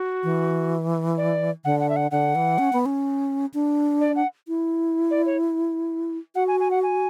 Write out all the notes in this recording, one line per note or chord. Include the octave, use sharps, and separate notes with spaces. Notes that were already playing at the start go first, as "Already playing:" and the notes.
Already playing: F#4
E3
D5
D3 F#5
F#5
E5
F#5
D3 F#5
E3
C#4
B3
C#4
D4
D5
F#5
E4
D5
C#5
F#4 F#5
G#5
G#5
F#5
G#5